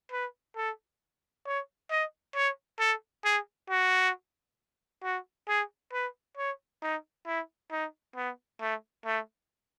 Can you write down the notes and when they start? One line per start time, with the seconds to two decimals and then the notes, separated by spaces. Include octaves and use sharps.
0.12 B4
0.57 A4
1.46 C#5
1.91 D#5
2.35 C#5
2.80 A4
3.24 G#4
3.70 F#4
5.04 F#4
5.48 G#4
5.93 B4
6.38 C#5
6.82 D#4
7.26 E4
7.71 D#4
8.16 B3
8.61 A3
9.06 A3